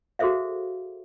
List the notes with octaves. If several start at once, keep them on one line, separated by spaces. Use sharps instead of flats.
F#4 G#4 A4 C5 E5 F5